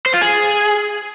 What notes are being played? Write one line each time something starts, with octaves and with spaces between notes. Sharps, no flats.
C5
F4
G#4